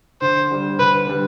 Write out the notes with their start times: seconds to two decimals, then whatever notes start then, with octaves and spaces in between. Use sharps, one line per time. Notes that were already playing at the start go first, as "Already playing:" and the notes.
0.22 D3 C5
0.51 G3 D4
0.79 D3 B4
1.07 G3 D4